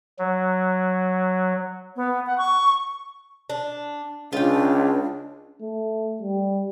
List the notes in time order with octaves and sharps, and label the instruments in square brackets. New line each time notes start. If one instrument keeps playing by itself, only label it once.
[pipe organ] F#3
[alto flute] B3
F#5
C#6
[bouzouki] D4
[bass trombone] C#2 [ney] D4 [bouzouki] F4 G5
[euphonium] A3
G3